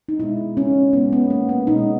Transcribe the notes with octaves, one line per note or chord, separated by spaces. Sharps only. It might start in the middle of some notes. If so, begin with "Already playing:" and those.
D#4
B2 G#3 E4
C#4
B2 G#3 B3
B3
A#3
B3
B2 G#3 D#4